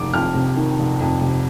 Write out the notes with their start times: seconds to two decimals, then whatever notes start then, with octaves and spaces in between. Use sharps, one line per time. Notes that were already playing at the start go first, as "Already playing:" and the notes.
Already playing: F1 D#3 D6
0.13 F2 F6
0.34 C3
0.57 D#3
0.79 F1
1.00 F2
1.21 C3